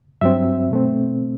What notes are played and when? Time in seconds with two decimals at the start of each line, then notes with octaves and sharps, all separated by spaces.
0.21 G2 F#3 C4 E5
0.71 B2 A3 C4